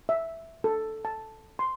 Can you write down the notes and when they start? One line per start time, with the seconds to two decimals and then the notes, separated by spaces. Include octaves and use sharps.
0.09 E5
0.64 A4
1.05 A5
1.59 C6